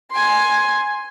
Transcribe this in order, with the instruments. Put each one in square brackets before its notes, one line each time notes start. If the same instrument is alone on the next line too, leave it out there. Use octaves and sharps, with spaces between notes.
[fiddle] G#5 C6